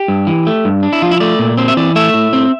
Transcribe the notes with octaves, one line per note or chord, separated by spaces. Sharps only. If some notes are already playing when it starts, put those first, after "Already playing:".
Already playing: G4
G2
E3
A3
G2
D4
E4
F3 F4
E4
A3 D5
A#2
C4 C5
E5
E3 D5
A3 E5
A2
C4